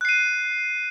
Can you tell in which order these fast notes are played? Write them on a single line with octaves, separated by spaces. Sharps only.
F#6 C7 D#7